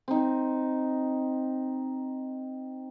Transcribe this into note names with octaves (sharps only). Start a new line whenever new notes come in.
C4 D#4